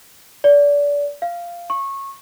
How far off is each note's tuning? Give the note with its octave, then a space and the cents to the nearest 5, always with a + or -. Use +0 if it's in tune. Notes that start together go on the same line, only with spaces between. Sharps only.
D5 -30
F5 -10
C#6 -20